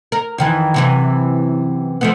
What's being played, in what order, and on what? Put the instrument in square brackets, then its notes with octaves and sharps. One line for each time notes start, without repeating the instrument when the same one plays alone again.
[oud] A#4
F2 D#3 E3
F#2 C3 E3
F3 A3 B3